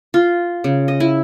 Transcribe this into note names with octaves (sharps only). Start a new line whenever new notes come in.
F4
C#3
D#5
E4